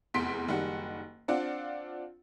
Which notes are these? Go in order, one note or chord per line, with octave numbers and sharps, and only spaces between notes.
F1 E2 C6 B6 D7
F#1 D#3 G3 F#5
C4 D4 F4 D5 F#5